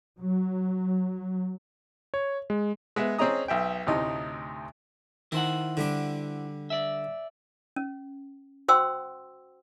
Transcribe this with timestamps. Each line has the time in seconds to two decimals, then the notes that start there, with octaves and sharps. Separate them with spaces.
0.19 F#3
2.14 C#5
2.50 G#3
2.96 G#3 B3 E5
3.18 C4 C#4 G#4 D#5 A#5 D#6
3.48 B1 E5 G5
3.87 D2 A2 C3 D#4 D#5
5.32 D#3 E4 C5 F#5
5.77 D3 G3 D4
6.70 D5 E5
7.76 C#4
8.68 F#4 C5 F#5 G5 C6 E6